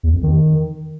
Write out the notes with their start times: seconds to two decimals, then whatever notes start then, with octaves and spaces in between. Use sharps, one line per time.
0.03 E2
0.13 F2
0.23 D#3